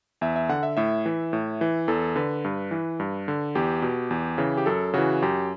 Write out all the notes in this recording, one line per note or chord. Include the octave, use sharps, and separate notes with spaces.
E2 E5
E5
D3 F#5
E5
A2 E5
E3
A2
E3
E2 A4
D3 B4
G2
E3
G2
D3
E2 G4
B2
E2
C#3 E3
G4
F#2 A4
C#3 E3 F#4
F#2 G4